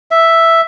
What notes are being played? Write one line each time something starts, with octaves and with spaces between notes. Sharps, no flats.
E5